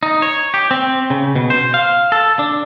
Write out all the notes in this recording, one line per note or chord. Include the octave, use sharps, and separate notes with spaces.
D#4
C#5
G4
C4
C#3
B2
C5
F5
A4
D4